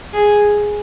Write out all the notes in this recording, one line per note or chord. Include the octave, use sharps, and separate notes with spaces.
G#4